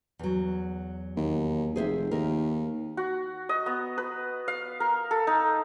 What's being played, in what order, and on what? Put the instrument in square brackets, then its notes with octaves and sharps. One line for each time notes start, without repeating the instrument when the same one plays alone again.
[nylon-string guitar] E2 F#3
[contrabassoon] D#2
[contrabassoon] F1 [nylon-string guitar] G#4 C5 E5
[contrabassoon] D#2 [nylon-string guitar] A#4
[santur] F#4
D#5
B3
B4
F5
A#4
A4
D#4